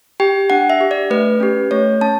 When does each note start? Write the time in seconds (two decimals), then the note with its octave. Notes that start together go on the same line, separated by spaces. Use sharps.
0.20 G4 G5
0.50 D4 F#5
0.70 E5
0.81 G4
0.91 D5
1.10 A3 B4
1.40 C#4 G4
1.71 A3 C#5
2.01 C#4 A5